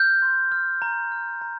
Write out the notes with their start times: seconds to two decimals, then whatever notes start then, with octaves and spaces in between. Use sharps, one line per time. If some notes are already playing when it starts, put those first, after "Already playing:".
Already playing: F6 G6
0.22 C6
0.52 F6
0.82 A#5
1.12 F6
1.41 A#5